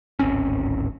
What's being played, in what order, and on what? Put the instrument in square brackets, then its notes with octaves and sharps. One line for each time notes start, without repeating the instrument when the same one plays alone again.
[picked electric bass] D1 G#1 C4 C#4